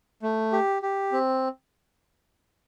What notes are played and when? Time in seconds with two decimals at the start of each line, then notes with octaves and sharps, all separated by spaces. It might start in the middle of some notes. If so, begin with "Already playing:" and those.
0.22 A3
0.52 G4
0.82 G4
1.12 C4